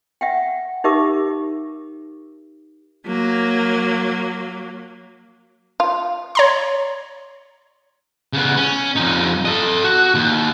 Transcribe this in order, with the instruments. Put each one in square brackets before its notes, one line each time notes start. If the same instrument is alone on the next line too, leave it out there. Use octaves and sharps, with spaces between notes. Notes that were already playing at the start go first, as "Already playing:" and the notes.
[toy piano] E5 F#5 G5
D#4 G4 A#4 E5 D6
[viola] F#3 A#3
[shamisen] F4
[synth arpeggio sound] C#5 A#5 C6
[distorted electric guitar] C#3 B3
C#4
F2 D#4
A4 D#5
F#4
D#2